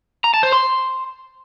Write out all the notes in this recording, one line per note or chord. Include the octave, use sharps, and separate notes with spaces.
A#5
A5
C5
C6